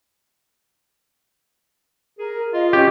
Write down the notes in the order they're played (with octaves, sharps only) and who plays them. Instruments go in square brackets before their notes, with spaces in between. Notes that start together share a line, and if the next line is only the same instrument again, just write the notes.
[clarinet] G#4 [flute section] A#4
[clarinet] F4 [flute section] D#5 F5
[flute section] C#4 [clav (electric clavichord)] G4